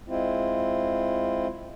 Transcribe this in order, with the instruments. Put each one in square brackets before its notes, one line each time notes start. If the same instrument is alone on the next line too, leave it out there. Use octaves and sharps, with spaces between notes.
[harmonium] G#3 C4 E4 F4